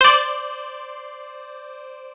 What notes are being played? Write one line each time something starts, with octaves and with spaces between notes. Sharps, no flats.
C5 D5